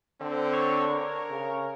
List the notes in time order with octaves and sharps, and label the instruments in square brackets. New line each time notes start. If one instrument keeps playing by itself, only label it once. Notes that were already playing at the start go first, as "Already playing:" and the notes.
[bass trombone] D3 [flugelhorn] C4
[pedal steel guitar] C#5
[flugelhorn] A#4
[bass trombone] C#3